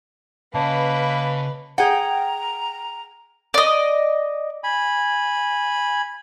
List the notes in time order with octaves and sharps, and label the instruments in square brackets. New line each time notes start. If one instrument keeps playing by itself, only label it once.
[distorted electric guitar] C#3 [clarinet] A#3 [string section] B4 [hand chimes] C#5 D#5 A5
[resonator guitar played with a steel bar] G#4 F#5 [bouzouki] G5 [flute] A#5
[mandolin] D5 D#5
[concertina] G#5 B5